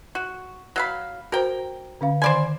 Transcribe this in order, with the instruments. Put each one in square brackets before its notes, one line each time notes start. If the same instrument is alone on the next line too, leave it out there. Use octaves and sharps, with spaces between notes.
[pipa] F#4
F#3 F5 B5
[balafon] F#4 C5 [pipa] A#4 G5
[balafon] D3 C#4 F5
[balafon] D#3 B5 C6 [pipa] C5 D5 G#5